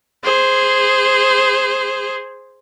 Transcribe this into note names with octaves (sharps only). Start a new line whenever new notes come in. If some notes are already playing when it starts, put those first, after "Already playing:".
G#4 C5